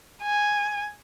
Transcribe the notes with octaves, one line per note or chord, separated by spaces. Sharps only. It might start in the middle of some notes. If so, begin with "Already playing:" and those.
G#5